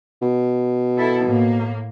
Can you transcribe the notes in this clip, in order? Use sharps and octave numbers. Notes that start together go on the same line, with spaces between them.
B2
E4 A4
A2 A#3